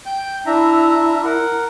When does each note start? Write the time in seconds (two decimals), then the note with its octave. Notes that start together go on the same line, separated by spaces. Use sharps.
0.06 G5 G6
0.46 D4 E4 E5 A#5
1.24 A#4 F#5